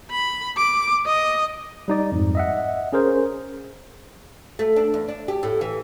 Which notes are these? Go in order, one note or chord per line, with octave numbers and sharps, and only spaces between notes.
B5
D6
D#5
G3 D#4 D5
F2 G#2
D#5 E5 F#5
C#4 G#4 A#4 C5
A3
D4
E2
D4
G4
A2
E3